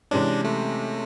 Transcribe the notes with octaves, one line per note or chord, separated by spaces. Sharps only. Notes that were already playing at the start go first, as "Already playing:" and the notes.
C3 E3 G#3 C#4 D4
A3